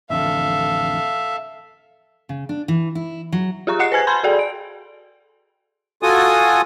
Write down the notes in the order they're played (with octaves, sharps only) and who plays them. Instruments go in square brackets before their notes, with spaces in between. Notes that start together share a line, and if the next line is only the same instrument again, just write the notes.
[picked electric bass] A1 F2 D3 [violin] A4 F5 [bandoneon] E5
[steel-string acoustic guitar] C#3
D4
E3
E4
F#3
[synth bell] F4 G4 G#4 A#5 C#6
G#4 D#5 F#5 F#6 C7 C#7
B4 C5 G#5 G#6
G#5 A5 B5 C6 G6 G#6
F#4 G#4 A4 D5 G5 G#5
D7
[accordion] F4 F#4 A4 G#5 D#6